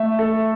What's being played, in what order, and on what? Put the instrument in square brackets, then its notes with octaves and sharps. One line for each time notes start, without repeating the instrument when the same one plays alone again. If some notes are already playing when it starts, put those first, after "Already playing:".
Already playing: [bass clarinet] A3 [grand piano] E5
[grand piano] A4